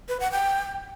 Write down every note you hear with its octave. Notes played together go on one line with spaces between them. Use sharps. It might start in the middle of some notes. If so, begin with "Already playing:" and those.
B4
F#5
G5